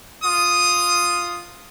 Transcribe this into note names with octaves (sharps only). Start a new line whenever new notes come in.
F4 D#6